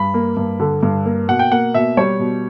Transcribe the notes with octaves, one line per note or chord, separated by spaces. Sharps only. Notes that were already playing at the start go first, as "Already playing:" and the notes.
Already playing: G2 B5
A#3
G2
D3
G2
A#3
B2 F#5
G5
A#3 F#5
B2 E5
G3 C#5
B2